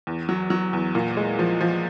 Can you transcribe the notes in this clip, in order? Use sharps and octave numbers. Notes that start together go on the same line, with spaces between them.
E2
F#3
F#3
E2
A#2
G#3
F3
F3